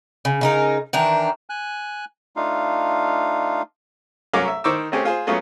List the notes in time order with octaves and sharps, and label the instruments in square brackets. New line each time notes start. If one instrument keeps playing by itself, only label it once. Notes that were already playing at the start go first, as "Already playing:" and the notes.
[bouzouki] C#3
C#3 D#4 A#4
D#3 E3 D4 A#5
[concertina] G#5 F#6
A3 D4 D#4 F4 F5
[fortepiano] C2 F#3 C#4 A#4 F5 D6
E5
D#3 C5 C#6 D6 E6
A3 C4 C#4 G4 G#4
F4 G#4 C5
F#3 A3 B3 C#4 F4 G#4